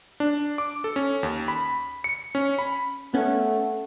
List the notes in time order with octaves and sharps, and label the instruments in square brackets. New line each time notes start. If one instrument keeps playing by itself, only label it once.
[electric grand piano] D4
D6
A4
C#4
D#2
B5
C#7
C#4
B5
[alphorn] A3 [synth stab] B3 C#4 [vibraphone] F#5